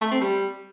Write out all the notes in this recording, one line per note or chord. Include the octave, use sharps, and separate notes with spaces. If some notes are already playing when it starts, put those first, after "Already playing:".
A3
C4
G3